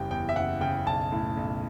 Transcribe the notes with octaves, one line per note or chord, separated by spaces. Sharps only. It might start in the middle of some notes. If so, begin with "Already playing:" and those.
Already playing: F#1 E2 C#3 G3 G5
E2 G5
E5
F#1 F#5
C#3 G5
B1 A5
A2
B1